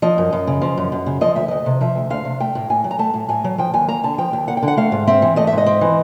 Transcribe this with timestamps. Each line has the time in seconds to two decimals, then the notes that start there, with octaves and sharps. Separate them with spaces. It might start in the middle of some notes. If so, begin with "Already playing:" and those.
0.02 F3 D#5
0.18 F#2
0.33 F#2
0.47 C#3
0.62 F3
0.78 F#2
0.92 F#2
1.06 C#3
1.21 F3 D#5
1.35 D2 E5
1.48 D2 D#5
1.66 C3
1.81 F3 E5
1.95 D2
2.10 D2 F5
2.25 C3
2.40 A3 G5
2.55 A2
2.70 A2 G#5
2.84 F#3
2.91 A#5
2.99 A3 A5
3.14 A2
3.29 A2 G#5
3.44 F#3
3.58 F3 G5
3.74 D#2 G#5
3.89 A#3 A#5
4.03 D3 A5
4.18 F3 G5
4.33 D#2
4.48 A#3 F#5
4.57 G5
4.63 D3
4.68 F#5
4.77 A3 F5
4.92 G#2
5.07 C4 E5
5.22 E3
5.36 A3 D#5
5.47 E5
5.52 G#2
5.58 D#5
5.66 C4
5.81 E3